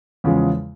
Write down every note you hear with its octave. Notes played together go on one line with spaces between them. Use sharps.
E2 C#3 F3 G#3